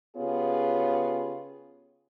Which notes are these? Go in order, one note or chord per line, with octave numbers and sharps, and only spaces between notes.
C#3 B3 F4 G4 G#4 C#5